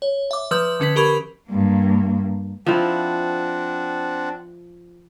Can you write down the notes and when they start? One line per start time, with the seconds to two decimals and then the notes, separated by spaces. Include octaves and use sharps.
0.02 C#5
0.31 E5 D6
0.51 F3 B4 D#6 E6 G6
0.80 D3 C#4 B4 B6
0.96 G4 A#4 B5 C#6 G#6
1.50 G2 A#3
2.66 F3 C4 D4 E4 F#5